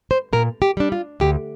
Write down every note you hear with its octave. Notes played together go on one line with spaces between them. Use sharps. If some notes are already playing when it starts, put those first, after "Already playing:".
C5
A#2 A#4
G4
G3 D4
F4
D2 G4